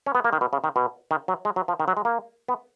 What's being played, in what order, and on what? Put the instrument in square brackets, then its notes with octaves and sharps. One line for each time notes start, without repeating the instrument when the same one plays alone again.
[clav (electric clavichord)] C#4
B3
A#3
D#3
B2
C#3
D#3
B2
D#3
F#3
G#3
F#3
F3
D#3
F#3
G#3
A#3
B3